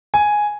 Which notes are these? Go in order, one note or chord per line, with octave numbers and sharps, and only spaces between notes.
G#5